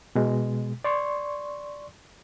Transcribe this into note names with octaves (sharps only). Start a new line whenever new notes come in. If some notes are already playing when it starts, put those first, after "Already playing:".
B2 G#3
D5 C6 C#6